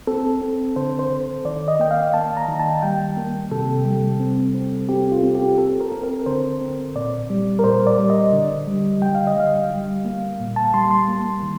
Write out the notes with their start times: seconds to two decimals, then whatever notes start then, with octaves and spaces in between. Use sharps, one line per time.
0.07 C4 A4
0.42 C4
0.76 D3 C5
0.99 C5
1.10 D3
1.45 D#3 D5
1.68 D#5
1.79 A#3 G5
1.91 F5
2.14 A#3 A5
2.37 A#5
2.48 D#3
2.60 A5
2.82 G3 G5
3.17 A#3
3.51 C3 A4
3.85 G3
4.20 C4
4.54 C4
4.89 C4 G4
5.12 F4
5.23 C4
5.35 G4
5.58 C4 A4
5.81 A#4
5.92 C4
6.03 A#4
6.26 D3 C5
6.61 C4
6.95 A#2 D5
7.30 G3
7.59 A#4
7.64 A#2 C5
7.87 D5
7.99 G3
8.10 D#5
8.33 D3
8.67 G3
9.01 D3 G5
9.15 F5
9.27 D#5
9.36 G3 F5
9.70 G3
10.05 A#3
10.40 A#2
10.56 A5
10.74 G3 C6
10.91 C6
11.08 A#3
11.42 D#3